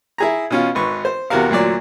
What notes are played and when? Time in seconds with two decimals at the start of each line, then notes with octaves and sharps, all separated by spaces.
0.18 E4 G#4 A#5
0.50 B2 C#4 F4
0.75 G#1 B4 C#6
1.05 C5
1.30 E2 C3 F#4 A#4 F5
1.51 D2 A#2 F#3 D5